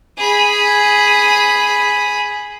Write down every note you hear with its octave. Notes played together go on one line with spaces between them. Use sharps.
G#4 B5